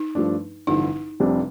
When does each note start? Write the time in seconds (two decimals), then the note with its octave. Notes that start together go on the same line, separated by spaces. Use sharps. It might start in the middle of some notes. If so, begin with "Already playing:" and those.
Already playing: D#4
0.15 G2 F3 A3 D4
0.67 A1 G2 D3 F3 D#4
1.20 F1 F2 C3 G3 D4